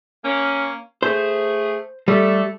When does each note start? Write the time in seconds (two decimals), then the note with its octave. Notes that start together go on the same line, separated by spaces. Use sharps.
0.24 A#3 C#4
1.03 A3 G#4 C5
2.08 G3 A3 A4